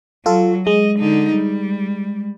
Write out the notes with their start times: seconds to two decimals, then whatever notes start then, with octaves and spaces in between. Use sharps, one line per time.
0.26 F#3 F4 A4
0.67 G#3 D#5
0.99 D3 D#4
1.34 G3